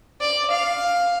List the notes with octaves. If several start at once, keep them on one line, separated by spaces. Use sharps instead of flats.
D5
F5